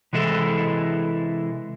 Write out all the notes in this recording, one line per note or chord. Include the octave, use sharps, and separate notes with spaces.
C3 E3 G#3 E4 A4